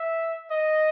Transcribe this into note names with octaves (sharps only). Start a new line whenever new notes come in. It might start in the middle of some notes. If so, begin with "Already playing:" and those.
Already playing: E5
D#5